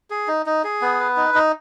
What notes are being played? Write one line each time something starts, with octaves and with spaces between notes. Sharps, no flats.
G#4
D#4
D#4
G#4
B3
B4
D#4
D#4